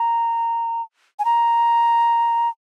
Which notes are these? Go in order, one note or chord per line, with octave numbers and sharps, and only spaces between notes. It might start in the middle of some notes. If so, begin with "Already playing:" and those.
Already playing: A#5
G#5
A#5